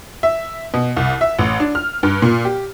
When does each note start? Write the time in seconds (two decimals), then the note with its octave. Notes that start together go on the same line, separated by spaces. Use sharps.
0.23 E5
0.74 B2
0.96 C2
1.21 E5
1.39 A1
1.60 D4
1.75 F6
2.03 G2
2.22 A#2
2.45 G4